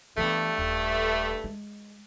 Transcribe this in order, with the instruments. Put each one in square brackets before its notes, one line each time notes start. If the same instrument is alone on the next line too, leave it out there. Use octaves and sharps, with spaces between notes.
[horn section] G2 A3 [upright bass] E3 B3
[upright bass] D#1
G#3